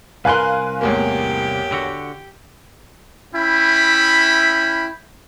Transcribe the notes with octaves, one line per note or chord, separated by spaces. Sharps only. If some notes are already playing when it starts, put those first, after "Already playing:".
C2 A#4 B4 F5 G#5 C6 F#6
A1 E2 A#3 G4
D3 F#4
C#4 E4 E5 G5 B5